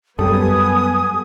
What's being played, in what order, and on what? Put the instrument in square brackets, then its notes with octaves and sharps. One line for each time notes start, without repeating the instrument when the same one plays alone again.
[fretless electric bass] F#2 G3 [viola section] B3 G#5 [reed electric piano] G4 A4 [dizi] D#6